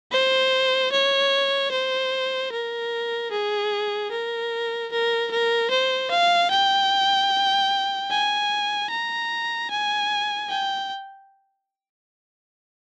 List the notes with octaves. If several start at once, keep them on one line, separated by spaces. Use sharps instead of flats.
C5
C#5
C5
A#4
G#4
A#4
A#4
A#4
C5
F5
G5
G#5
A#5
G#5
G5